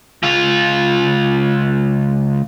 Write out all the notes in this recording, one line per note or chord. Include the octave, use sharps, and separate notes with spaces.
C#2 F4